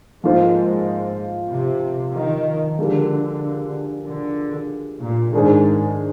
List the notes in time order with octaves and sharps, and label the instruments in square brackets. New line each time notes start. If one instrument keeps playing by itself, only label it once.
[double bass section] G#2 [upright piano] F3 A#3 F4 C5
[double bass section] C3
D#3
[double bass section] D3 [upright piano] F3 G#3 D4 G4 A#4
[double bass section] D3
A#2
[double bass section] G#2 [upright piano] D#3 G#3 D4 G#4 C5